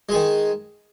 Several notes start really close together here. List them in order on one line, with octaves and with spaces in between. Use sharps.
G#3 G#4 D#3